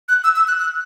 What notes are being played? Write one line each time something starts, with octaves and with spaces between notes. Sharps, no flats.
F#6
E6
E6
F#6
F#6